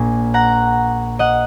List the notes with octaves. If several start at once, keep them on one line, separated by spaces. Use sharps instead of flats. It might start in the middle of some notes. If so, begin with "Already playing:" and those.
Already playing: A#1 A#2 A#3 G#5
F#5 A#5
D#5 F#5